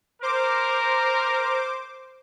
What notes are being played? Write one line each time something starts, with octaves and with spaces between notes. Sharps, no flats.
A#4 C5 D6